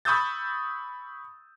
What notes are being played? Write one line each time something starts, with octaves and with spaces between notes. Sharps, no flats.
B5 C#6 D#6 E6 G6 A6